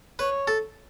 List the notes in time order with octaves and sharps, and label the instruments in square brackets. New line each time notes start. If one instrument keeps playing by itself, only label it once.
[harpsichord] B4 [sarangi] C#5
[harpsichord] A4